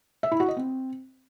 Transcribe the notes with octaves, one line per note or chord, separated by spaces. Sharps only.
E5
E4
F#4
D#5
C4